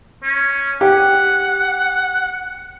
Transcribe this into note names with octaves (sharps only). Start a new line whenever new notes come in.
C#4
G4 F#5